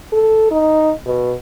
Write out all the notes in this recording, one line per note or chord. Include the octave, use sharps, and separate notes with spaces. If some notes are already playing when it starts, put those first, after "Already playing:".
A4
D#4
B2